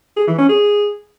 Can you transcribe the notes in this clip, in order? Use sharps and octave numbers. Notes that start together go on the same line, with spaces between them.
G#4
E3
C#4
G#4